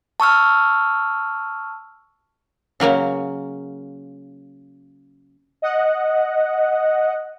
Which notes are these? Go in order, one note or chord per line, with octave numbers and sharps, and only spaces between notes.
A5 C#6 E6 F6
C#3 F#3 A#3 C#4
D#5 F#5